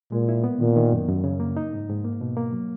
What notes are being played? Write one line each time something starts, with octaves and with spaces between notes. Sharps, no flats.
A#2 G#3
E4
B3
A#2 D#3
D#3
F#2
F#2
C#3
A#3
D#4
G#2
G#2
A#3
B2
A#3
F#3